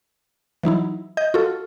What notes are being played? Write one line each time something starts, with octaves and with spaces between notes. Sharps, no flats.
E3 F#3 D#4 E4
D#5 G6
F4 F#4 A4